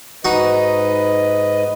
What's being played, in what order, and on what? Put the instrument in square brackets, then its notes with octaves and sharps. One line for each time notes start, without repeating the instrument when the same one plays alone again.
[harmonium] G#2 B4 D#5 [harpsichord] D#4 F#4